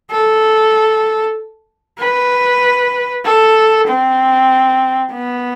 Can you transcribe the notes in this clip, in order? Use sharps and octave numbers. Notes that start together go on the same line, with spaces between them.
A4
B4
A4
C4
B3